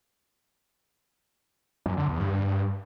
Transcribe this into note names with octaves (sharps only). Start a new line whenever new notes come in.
F#2
D3
E2
G2